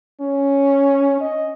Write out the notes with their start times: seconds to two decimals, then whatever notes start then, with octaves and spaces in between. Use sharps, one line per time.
0.21 C#4
1.21 D#5